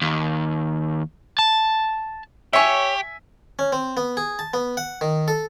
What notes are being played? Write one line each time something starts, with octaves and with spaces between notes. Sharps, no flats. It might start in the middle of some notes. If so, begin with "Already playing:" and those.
D#2
A5
G4 C#5 E5 G#5 C#6
C#4
C4
B3
G#4
A5
B3
F#5
D#3
A4